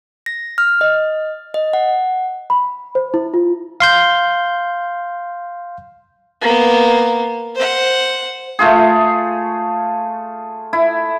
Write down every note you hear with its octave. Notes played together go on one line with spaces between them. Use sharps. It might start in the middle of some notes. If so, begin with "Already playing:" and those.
A#6
F6
D#5
D#5
F#5
B5
C5
E4
F4
F5 C6 G6
A#3 B3
C5 F#5
A3 F4 G#4
E4